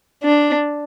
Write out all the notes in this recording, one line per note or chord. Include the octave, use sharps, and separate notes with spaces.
D4